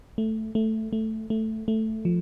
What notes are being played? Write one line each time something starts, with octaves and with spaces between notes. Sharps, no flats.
A3
A3
A3
A3
A3
F3